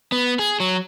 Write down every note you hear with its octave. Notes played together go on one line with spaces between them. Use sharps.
B3
G#4
F#3